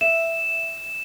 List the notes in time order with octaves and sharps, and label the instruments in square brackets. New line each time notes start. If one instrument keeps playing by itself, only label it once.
[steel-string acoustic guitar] E5 [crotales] E7